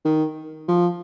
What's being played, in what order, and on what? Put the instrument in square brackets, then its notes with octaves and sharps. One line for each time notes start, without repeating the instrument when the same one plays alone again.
[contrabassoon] D#3
F3